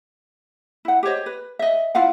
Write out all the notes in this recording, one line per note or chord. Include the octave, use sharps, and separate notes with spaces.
E4 F#5
G4 C5 C#5 D#5
B4
D#5 E5
E4 F4 F5 F#5